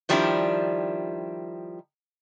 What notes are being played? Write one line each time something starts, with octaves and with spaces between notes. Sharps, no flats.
D#3 F3 G3 B3 D4 E4